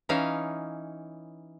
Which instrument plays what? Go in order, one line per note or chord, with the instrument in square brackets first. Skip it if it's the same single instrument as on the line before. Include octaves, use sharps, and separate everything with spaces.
[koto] E3 C#4 D#4 F5